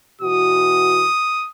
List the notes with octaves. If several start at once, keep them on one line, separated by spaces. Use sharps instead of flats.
B2 E3 F#4 D#6